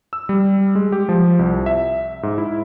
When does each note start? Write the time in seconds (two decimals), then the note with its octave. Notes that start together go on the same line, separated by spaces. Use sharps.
0.13 E6
0.29 G3
0.75 G#3
0.92 G4
1.09 F3
1.39 C2
1.66 E5
2.23 G#2
2.38 E4